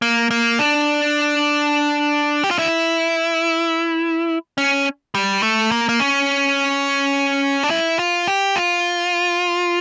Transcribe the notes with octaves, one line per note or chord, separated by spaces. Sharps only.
A#3
A#3
D4
G4
F4
E4
C#4
G3
A3
A#3
A#3
C#4
D4
E4
F4
G4
F4